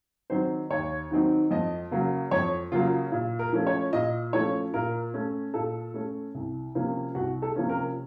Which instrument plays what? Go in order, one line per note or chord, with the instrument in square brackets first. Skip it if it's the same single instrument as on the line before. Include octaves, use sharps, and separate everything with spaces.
[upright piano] D#3 F#3 C4 D#4 C5
D#2 C#5
D#3 F#3 C4 D#4
F2 D#5
C#3 F#3 A#3
F2 C#5
C#3 F#3 A#3 F4
A#2
A#4
F3 A3 C#4
C#5
A#2 D#5
F3 A3 C#4 C#5
A#2 A#4
A3 C#4
A#2 A4
A3 C#4
C2
C3 F3 A#3 C#4
C2 F#4
A4
C3 F3 A#3 C#4
A#4